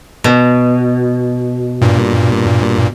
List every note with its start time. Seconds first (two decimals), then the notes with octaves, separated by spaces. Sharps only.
0.24 B2
1.82 G2 A#2